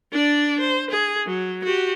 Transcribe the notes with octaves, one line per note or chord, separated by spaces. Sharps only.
D4 D5
C5
G#4
F#3
F#4 G4